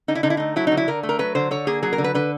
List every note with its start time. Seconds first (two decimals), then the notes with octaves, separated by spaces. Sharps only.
0.08 D3 D#4
0.15 E4
0.23 D3 D#4
0.30 E4
0.37 A3 D#4
0.56 F#3 E4
0.67 D3 D#4
0.77 E4
0.88 D3 A#4
1.03 A3
1.09 A#4
1.19 F#3 B4
1.35 D3 C5
1.51 D3 C#5
1.67 A#3 G#4
1.82 F#3 G#4
1.93 A#4
1.98 D3
2.04 B4
2.15 D3 B4